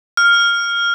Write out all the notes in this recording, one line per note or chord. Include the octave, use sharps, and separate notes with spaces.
F6